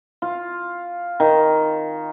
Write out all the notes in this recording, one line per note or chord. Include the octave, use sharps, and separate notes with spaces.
F4
D#3